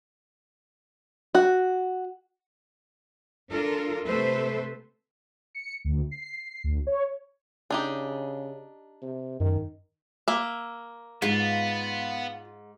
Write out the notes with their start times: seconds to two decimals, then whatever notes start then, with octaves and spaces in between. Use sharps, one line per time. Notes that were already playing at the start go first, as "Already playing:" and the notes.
1.35 F#4
3.50 D4 F4 A4 A#4
4.05 C3 A3 A4 B4 C5 E5
5.55 C#7
5.85 D2
6.11 C7
6.64 D2
6.87 C#5
7.70 C#3 D4 D#4 G4
9.02 C3
9.40 F#2 D#3
10.28 A#3 E5
11.22 G#2 B3 F4